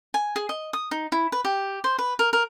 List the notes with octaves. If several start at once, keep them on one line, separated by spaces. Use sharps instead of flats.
G#5
G#4
D#5
D#6
D#4
E4
B4
G4
C5
B4
A#4
A#4